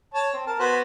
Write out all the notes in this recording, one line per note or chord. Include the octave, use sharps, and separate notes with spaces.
C#5 A5
C4
A#4 A5
B3 F#4 C5